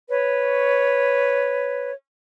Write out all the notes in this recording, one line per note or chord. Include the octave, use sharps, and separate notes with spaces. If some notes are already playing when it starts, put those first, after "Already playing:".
B4 C#5